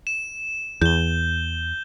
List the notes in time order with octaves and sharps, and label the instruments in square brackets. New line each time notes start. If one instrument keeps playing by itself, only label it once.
[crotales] E7
[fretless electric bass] E2 [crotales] G6 G7